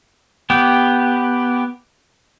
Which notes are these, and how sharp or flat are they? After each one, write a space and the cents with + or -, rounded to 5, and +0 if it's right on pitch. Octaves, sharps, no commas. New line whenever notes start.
B3 +0 G4 +0